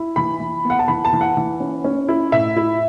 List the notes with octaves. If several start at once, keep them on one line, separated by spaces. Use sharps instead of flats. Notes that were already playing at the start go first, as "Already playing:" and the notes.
Already playing: E4
E3 B5
E3
B3
F#5
A5
E3 B5
A5
E3
F#5
E3
C#4
C#4
E4
A2 E5
E4